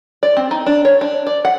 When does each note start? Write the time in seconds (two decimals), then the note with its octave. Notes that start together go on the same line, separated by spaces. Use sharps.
0.23 D5
0.37 C4
0.51 D#4
0.66 D4
0.85 C#5
1.01 D4
1.27 D5
1.45 F#5